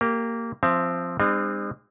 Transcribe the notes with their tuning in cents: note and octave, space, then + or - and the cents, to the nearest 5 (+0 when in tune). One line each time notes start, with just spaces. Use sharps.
A#3 -15 G4 +0
F3 +0 C4 +0 E5 +35
G#3 -45 C4 -15 D#4 -45